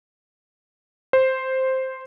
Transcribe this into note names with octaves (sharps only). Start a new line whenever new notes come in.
C5